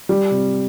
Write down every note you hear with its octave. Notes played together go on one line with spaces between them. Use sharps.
G3
C3